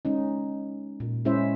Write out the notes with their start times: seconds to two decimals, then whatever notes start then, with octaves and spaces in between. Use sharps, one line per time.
0.05 G#3 C#4 D#4
1.00 A#2
1.25 G#3 C#4 E4 C5 E5